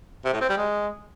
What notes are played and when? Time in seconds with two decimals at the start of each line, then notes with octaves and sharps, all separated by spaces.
0.25 C3
0.33 A2
0.41 C4
0.49 G3
0.57 G#3